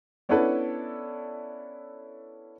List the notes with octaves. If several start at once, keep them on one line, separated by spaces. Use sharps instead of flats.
B3 C#4 D4 E4 A4 B4